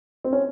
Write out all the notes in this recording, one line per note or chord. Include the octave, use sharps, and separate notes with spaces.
C4
C#4